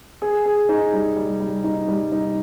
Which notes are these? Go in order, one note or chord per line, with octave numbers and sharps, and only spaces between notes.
G#4
G#4
D#4
G3
G3
G3
D#4
G3
D#4